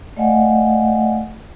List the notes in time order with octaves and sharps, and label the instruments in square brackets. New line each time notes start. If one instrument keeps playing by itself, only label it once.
[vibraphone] A3 D5 D#5 F5 F#5 G#5